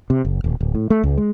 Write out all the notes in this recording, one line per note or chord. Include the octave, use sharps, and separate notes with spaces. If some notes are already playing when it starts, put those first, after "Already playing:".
C3
F#1
D#1
D1
A2
A3
C#2
G#3